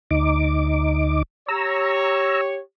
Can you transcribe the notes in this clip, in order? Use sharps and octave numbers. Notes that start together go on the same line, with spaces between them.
D2 D#4 D6
G4 C#5 A#5 E6